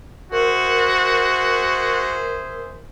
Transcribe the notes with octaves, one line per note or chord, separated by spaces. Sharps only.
F#4 G#4 A#4 C5 E5